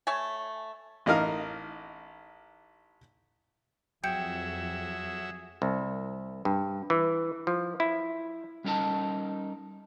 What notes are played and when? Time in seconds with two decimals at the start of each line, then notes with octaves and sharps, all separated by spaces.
0.07 A3 C#5 E5 G#5
1.06 A1 D#4 A#4 F5
4.04 F2 F#3 G#4 E5 G5 G6 C#7
5.62 C2
6.45 G2
6.90 E3
7.47 F3
7.80 E4
8.64 G3 C#4 D#4 A#4 A5